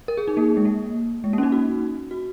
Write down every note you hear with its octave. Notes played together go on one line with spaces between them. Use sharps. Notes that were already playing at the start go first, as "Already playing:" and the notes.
A#4
G#4
D#4
A#3
G#3
A#3
G#3
A#3
C#4
D#4
F#4
F#4